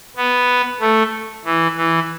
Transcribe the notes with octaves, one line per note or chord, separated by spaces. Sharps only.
B3
A3
E3
E3